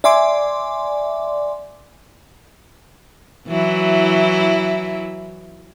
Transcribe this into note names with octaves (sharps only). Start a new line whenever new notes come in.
D5 E5 G#5 C6 D6
E3 F#3 E4